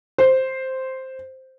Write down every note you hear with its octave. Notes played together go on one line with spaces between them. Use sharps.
C5